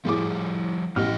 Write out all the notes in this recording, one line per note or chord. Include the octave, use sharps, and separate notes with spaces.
A2 F3 G3 G#4 D6
A1 A2 G4 D#5 F6